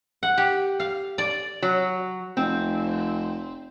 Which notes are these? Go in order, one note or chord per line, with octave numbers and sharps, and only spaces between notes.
F#5
G4
F5
D5
F#3
F1 C4